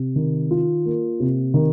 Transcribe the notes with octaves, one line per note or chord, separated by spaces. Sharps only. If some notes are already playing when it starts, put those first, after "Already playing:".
Already playing: C3
D#3
F4
A#3
C3
D#3